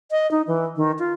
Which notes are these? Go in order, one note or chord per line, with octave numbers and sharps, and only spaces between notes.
D#5
D#4
E3
D#3
F4